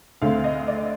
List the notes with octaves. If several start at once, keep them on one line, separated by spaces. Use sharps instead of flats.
D2 D3 A3 C4 F5
D#5
D5